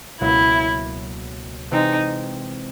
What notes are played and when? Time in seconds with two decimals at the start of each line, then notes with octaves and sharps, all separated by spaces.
0.21 C#2 B2 F#3 A#3 E4
1.71 C3 E3 G#3 C4 D#4